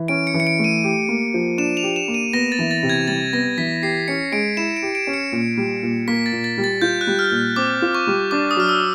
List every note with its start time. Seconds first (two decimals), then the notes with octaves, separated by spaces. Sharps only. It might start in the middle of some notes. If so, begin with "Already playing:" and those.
Already playing: E3
0.08 C#4 D7
0.27 C#7
0.34 E3
0.40 C#7
0.47 D7
0.59 A3
0.64 D#7
0.84 G4
1.09 A#3
1.34 F3
1.58 D4 E7
1.77 F7
1.83 G4
1.96 E7
2.08 A#3
2.14 D#7
2.33 B3 A#6
2.52 A6
2.59 E3
2.71 A6
2.83 C3
2.89 G#6
3.08 G3 A6
3.33 B3 A#6
3.58 E3 B6
3.82 G4 C7
4.08 C#4 C#7
4.32 G#3 D7
4.57 E4 E7
4.76 D7
4.82 G4
4.95 D7
5.07 C#4
5.13 C#7
5.32 A#2
5.57 G3
5.83 A#2
6.08 A#3 B6
6.26 A6
6.32 A#2
6.44 A6
6.58 G3
6.64 A6
6.82 F4 G6
7.01 F#6
7.07 G3
7.19 F6
7.31 A#2
7.56 C4 D6
7.82 F4
7.94 C#6
8.07 G3
8.31 D4 D6
8.51 D#6
8.56 F#3 F6
8.69 E6